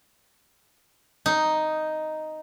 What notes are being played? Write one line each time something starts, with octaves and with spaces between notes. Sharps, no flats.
D#4